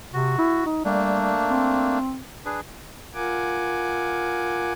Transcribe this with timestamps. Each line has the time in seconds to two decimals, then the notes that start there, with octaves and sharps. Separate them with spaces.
0.14 C3 F#4
0.39 E4
0.66 D#4
0.85 G3 A3 A#3 D4
1.50 C4
2.45 D4 G#4 B4
3.14 F4 A#4 F#5 G#5 D6